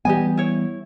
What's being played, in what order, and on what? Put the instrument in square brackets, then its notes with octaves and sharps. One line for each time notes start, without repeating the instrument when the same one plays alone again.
[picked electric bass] E3 G3 B3 [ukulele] G4 D#5 G#5
[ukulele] E4 C#5